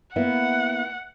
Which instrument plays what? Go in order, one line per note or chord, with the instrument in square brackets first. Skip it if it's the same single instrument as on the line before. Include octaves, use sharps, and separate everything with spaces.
[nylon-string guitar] A#3 B3 E4 [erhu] F#5